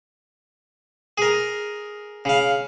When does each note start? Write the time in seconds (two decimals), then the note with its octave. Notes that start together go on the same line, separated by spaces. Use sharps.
1.18 G#4 A#4
2.25 C#3 F5